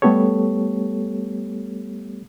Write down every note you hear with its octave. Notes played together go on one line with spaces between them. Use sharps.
G3 A3 B3 G4 A4 C#5